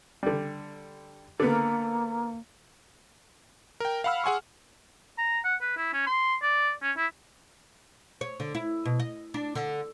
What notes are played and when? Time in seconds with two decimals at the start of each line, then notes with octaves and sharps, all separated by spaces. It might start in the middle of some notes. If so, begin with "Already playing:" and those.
0.23 D3 G3
1.40 D3 A#3 B3
3.80 A#4 G5
4.04 F5 F#5 B5 E6 F6
4.24 G#4 F#5 G#5 C6 C#6
5.18 A#5
5.45 F#5
5.62 B4
5.77 E4
5.93 C#4
6.07 C6
6.42 D5
6.82 C#4
6.97 E4
8.21 C#5
8.40 D3
8.55 E4
8.85 B2
9.00 D#5
9.34 D4
9.55 D3